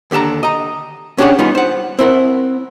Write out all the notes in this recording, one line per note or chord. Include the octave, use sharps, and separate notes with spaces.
D#2 D3 G4 A5 A#5
D#5 A#5
C#4 D4 G4 G#4 C#5 F#5
G3 B3 C#4 D#4 F4
C5 F#5
C4 E4 A#4 F#5